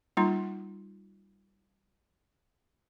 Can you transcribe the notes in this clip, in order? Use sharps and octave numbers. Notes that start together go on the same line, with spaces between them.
G3 A#3 D#4 F4 C6